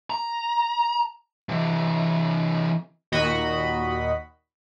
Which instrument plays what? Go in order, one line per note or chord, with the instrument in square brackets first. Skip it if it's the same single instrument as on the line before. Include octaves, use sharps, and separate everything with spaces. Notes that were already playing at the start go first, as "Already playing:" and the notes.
[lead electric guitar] A#5
C3 E3
[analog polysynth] D#2 A#2 D#3 F#4 D#5 B5